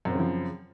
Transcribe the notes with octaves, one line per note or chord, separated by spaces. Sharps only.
F#2 C#3 F3 C4